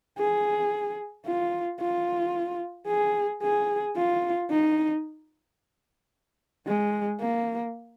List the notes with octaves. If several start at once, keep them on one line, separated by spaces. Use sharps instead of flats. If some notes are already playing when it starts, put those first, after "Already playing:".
G#4
F4
F4
G#4
G#4
F4
D#4
G#3
A#3